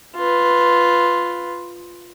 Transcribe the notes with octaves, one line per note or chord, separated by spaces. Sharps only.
F4 B4